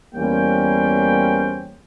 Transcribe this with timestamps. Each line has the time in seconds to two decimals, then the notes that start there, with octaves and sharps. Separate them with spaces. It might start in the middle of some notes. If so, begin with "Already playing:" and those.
0.14 E2 G3 A#3 C#4 C5 G5